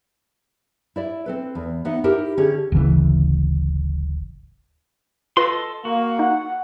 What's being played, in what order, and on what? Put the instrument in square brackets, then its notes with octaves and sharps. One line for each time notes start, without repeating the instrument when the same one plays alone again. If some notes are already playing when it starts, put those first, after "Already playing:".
[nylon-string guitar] E4 D5 E5
C4 A4 B4
E2
B3 D#4 E5 F#5
D#4 E4 G4 A#4 E5
D3 C#4 G4 G#4
[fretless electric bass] D1 G#1 C#3 E3
[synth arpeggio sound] F4 B4 [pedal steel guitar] A4 D#5 C6
[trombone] A#3 [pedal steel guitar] F#4 [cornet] F5
[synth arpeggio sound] D#4 [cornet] F#5